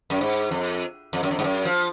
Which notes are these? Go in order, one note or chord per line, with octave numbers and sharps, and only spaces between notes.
F#2
G#2
F2
F2
F#2
F2
G#2
F#2
F3